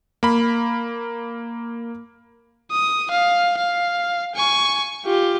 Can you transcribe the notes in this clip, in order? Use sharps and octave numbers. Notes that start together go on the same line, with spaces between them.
A#3 B5
D#6
F5
F5
G#5 C#6
F4 G4